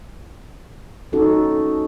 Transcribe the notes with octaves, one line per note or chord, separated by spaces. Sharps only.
C#4 D#4 F#4 A4